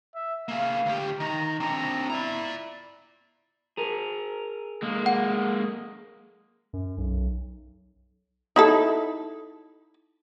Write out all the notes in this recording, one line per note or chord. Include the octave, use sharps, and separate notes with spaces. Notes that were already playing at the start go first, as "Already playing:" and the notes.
E5
A#3 G#4 F5
D2 G4
D#3 A#5
C4 D4 A#5
E4 D5 A#5
G#4 A#4
G#3 A#3
F#5
F#2
B1
D#4 E4 A4